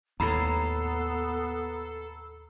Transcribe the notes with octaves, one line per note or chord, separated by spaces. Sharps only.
D#2 A2 B3 A4 A#5 B5 C7